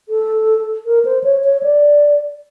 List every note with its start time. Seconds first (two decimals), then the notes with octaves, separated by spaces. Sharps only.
0.09 A4
0.86 A#4
1.05 C5
1.23 C#5
1.44 C#5
1.63 D5